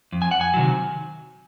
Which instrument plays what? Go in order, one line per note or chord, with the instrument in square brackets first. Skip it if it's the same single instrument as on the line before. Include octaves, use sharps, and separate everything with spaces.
[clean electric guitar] F2
G#5
F#5
G#5
C3 D#3 F#3